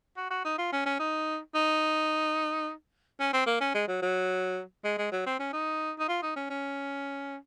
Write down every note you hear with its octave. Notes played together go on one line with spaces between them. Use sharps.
F#4
F#4
D#4
F4
C#4
C#4
D#4
D#4
C#4
C4
A#3
C#4
G#3
F#3
F#3
G#3
G#3
F#3
C4
C#4
D#4
D#4
F4
D#4
C#4
C#4